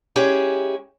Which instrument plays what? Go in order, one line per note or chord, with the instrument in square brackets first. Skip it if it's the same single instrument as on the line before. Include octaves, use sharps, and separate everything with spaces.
[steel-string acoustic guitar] G#3 C#4 E4 G4 G#4